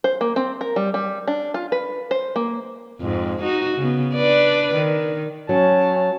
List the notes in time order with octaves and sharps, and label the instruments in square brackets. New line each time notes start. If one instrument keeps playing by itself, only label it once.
[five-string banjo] C5
A#3
C4
A#4
G3
G3
D4
F4
B4
C5
A#3
[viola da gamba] F2 G#2
D#4 F#4
C#3 B3
D4 B4 D5
D#3
[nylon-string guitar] F#3 [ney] C#4 [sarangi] A5